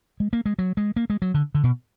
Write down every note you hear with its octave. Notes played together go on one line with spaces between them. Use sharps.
G#3
A#3
G#3
F#3
G#3
A#3
G#3
F#3
D3
D3
B2